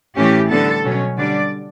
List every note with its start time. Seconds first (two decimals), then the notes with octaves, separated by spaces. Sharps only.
0.17 A2 E3 A3 C#4 E4 G4
0.51 D3 G3 B3 A4
0.84 B2 F#3 C#4
1.17 D3 G3 D4 D5